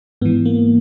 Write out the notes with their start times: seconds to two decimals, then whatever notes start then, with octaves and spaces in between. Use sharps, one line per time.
0.22 G#2 E3 B3
0.45 A#3